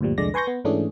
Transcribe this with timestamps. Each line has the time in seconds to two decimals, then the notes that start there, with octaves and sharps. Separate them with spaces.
0.01 D2 G2 A#2 F3 G3
0.18 C2 F2 D3 G#3 D5 A#6
0.34 B4 G#5 C6 C#6 G6 A#6
0.47 B3
0.65 G#2 E3 A3 C#4 D4 G#4